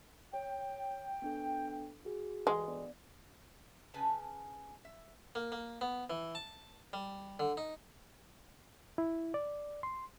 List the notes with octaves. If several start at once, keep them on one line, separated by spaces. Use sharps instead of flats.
C#5 G5
B3 D4 A4
F#4 G#4
D2 G2 E3 G#3
B3 D5
C#3 B4 G#5 A5
E5
A#3
A#3
B3
E3
A5
G3
D3
D#4
E4
D5
C6